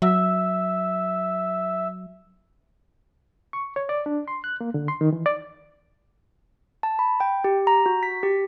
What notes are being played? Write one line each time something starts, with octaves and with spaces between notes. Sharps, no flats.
F#3 E5
C#6
C#5
D5
D4
C6
F#6
A#3
D3
C6
D#3
E3
D5
A5
B5
G5
G4
A#5
F#4
B6
G4